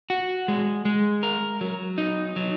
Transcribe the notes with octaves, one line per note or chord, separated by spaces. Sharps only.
F#4
G#3
G#3
A#4
F#3
D#4
F#3